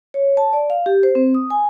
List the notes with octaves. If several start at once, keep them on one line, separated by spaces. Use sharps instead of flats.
C#5
A5
D5
F5
G4
C5
C4
D#6
G#5